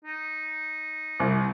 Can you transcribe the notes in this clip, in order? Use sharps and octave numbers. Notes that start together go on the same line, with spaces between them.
D#4
C2